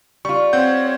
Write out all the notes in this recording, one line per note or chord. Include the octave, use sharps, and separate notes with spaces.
G3 F4 C#6
C4 C#5 F#5 G6